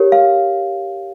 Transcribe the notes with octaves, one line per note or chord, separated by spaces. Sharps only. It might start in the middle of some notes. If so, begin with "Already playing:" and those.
Already playing: G4 A#4 C#5
F5